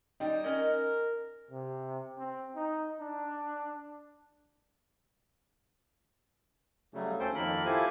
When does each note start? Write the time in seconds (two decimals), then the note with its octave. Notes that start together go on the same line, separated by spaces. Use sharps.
0.20 G3 D#4 G5
0.45 C#4 A#4 D#5
1.51 C3
2.18 C4
2.55 D#4
3.00 D4
6.94 C#3 F#3 G3 A3
7.20 D2 C#4 A4 C5 G5
7.35 F2 D#3 A#3 A4 A#4 B5
7.65 E4 F4 G4 A4 C5 G#5